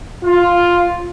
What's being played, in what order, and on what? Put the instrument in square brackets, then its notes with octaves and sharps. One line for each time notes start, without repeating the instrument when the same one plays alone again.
[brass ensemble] F4